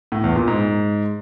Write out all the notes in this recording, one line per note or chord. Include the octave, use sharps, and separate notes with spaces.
A2
E2
A#2
G#2